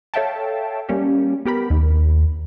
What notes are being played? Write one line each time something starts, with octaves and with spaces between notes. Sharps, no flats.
A4 C#5 E5 F5 G5 A5
G3 A#3 C#4 G4
B3 G4 A#4 B5
D#2